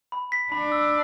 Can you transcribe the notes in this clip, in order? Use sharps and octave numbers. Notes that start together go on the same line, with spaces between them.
B5
B6
D4 B5
E6